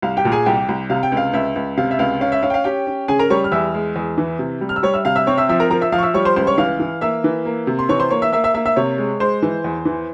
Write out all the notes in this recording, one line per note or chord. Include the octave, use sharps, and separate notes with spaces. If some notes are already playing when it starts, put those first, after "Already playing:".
C2 F5
G4 G5
A#2
G#4 G#5
C2 G4 G5
C2
C3 F5
G5
C#2
F5
C#2 E5
C#2
C3 F5
E5
C#2 F5
C#4 F5
E5
C#4 F5
G5
F5
C#4 G4 G5
C#4
C#3 G#4 G#5
A#4 A#5
G3 C#5 C#6
F6
E2 E5 E6
G#3
E2
E3
C3
G3
F6
E6
G3 C#5 C#6
E5 E6
C3 F5 F6
E5 E6
C4 C#5 C#6
E5 E6
F3 E5 E6
A#4 A#5
F3 A#4 A#5
E5 E6
F3 F5 F6
C#6
E5 E6
G3 C#5 C#6
C5 C6
C#2 C5 C6
C#5 C#6
E3 F5 F6
E3
A#3 E5 E6
E3
A#3
C3
C6
E3 C#5 C#6
C5 C6
A#3 C#5 C#6
E5 E6
A#3 E5 E6
E5 E6
A#3 E5 E6
E5 E6
C3 C#5 C#6
G#3
G#3 C5 C6
E3
E2
E3